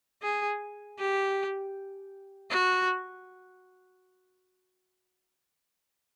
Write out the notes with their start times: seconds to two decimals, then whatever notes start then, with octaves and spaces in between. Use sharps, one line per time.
0.22 G#4
0.99 G4
2.50 F#4